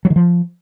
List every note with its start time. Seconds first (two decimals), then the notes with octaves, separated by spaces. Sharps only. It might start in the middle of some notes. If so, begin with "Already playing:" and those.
0.05 F#3
0.10 D#3
0.16 F3